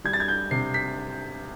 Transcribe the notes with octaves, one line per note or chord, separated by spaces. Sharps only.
G3 G#6
A6
G#6
G6
C3 C7
B6